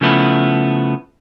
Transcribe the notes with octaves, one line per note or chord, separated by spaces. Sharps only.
C#3 F3 A3 B3 E4